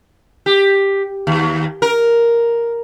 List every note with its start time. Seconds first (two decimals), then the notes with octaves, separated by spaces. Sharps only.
0.46 G4
1.27 D#2
1.82 A#4